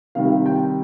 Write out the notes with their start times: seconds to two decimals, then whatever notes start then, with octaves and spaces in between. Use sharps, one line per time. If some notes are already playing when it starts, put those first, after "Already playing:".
0.15 C3 D#3 G3 F5
0.46 G5